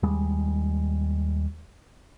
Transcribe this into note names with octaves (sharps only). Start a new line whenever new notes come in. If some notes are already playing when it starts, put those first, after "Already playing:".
D#2 G3 G#3